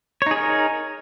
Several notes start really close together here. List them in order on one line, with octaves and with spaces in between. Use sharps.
C#5 D#4 G#4 A#4